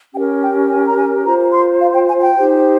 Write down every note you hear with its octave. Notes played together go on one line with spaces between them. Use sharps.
C#4 G4 A#4 G5
G5
G#5
A#5
G#5
F4 C5 A#5
C6
F5
G5
G#5
G5
D#4 G4 C5